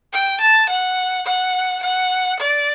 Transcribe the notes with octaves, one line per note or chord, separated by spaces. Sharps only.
G5
A5
F#5
F#5
F#5
D5